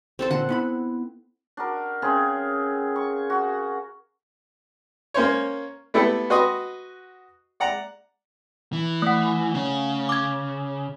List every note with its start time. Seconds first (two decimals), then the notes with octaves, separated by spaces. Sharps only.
0.19 C4 A4 C5
0.31 A#2 D3 F#5
0.49 B3 E4 B5
1.57 D4 F#4 A#4
2.02 C#3 C4 G#4 A#4
2.96 C#6
3.30 F#4
5.14 A#3 C#4 C5 C#5
5.94 A3 B3 E4 G4 A4 B4
6.30 F#4 B4 D#5 C6 C#6 D#6
7.60 D5 F#5 A#5
8.73 E3
9.02 A3 F#5
9.55 C#3
10.09 D6 G#6